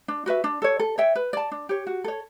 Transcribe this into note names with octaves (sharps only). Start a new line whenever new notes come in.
D4
F#4 B4 E5
D4
A4 C#5
A4
C#5 E5 G5
B4
D5 A5
D4
G4 C#5
F#4
A4 C#5